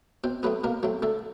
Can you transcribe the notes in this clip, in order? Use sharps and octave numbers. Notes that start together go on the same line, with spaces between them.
B2 C4 C5
F#3 A3 B3 C4 B4
B2 A#3 A#4
F#3 A3 C4
D3 A3 A4